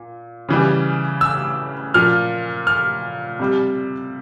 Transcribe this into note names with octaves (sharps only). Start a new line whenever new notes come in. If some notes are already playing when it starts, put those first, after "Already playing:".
Already playing: A#2
C#3 E3 G3
E6
A#2 F3 F6
F6
C3 G3